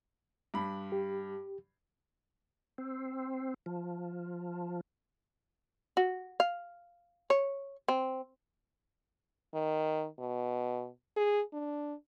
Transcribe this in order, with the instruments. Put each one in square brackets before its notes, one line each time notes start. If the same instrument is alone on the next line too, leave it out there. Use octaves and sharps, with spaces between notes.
[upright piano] G2 B5
[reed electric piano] G4
[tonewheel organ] C4
F3
[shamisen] F#4
F5
C#5
C4
[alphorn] D#3
B2
G#4
D4